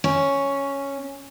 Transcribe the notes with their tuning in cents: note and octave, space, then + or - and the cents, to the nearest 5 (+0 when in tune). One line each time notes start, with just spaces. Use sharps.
C#4 +0